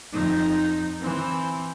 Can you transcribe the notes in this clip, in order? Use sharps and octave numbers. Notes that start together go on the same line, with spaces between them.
F2 D#4
E3 C4